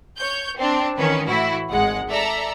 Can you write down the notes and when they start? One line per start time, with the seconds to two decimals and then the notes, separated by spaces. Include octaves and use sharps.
0.17 C#5 G6
0.57 C4 D4
0.97 D#3 E3 C#4 B4
1.27 A2 E3 E4 F#4
1.71 G#1 G#3 F#5
2.09 A4 D5 E5 A#5